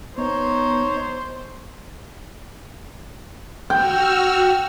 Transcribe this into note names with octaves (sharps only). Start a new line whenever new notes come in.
B3 D#4 C5 C#5
F#4 G5 E6 F6